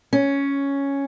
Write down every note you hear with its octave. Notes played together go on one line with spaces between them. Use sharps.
C#4